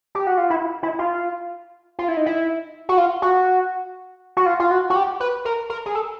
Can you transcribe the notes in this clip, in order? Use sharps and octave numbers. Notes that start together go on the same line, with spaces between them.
G4
F#4
F4
E4
E4
F4
F4
E4
D#4
E4
F#4
F4
F#4
F#4
F4
F4
F#4
F#4
G4
B4
A#4
A#4
G#4
A4